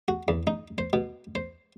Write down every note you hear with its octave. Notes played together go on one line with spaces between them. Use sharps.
F#4
E2
D#4
C5
B2
C5